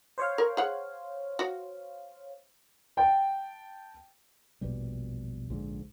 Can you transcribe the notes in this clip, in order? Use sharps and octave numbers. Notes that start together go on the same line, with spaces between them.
C5 C#5 F5
A#4
G#4 F#5
F#4
G5 A5
A#1 E2 B2 G3
A#1 G#2 D3